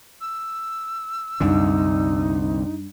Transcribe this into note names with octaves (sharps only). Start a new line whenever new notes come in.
E6
C2 F#2 D3 G3 D4 D#4